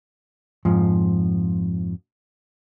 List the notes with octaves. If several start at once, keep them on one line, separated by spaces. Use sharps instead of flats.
F2 G#2 F3